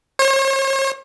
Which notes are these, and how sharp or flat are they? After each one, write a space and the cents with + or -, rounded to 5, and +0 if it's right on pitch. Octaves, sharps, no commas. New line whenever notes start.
C#5 -45